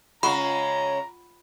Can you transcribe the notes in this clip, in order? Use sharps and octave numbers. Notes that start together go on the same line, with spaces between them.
C#3 G#3 F4 F#5 A#5 B5 C#6